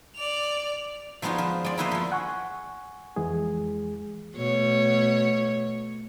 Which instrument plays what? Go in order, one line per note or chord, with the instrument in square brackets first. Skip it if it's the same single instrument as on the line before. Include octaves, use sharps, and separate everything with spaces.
[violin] D5 F7
[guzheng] F3 G#3 B3 D#4 F4 F#4
F3
G#3 D5
A#3 B3 E4 B4 C5 D#5
F3 F4
[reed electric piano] F#5 G#5 C#6
F2 E3 G#3 G#4
[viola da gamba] B2 A3 C#5